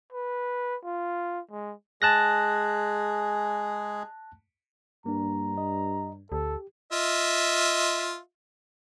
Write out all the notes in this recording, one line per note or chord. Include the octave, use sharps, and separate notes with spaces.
B4
F4
G#3
G#3 G#4 A5 F#6 A#6
G2 A#3 D4 A#5
D#5
D2 G4 A4
F4 D#5 E5